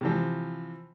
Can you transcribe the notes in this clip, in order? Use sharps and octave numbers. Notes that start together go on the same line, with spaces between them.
C3 E3 F3